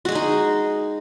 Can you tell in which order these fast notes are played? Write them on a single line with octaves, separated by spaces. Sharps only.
F#4 G#3 G#4 D#4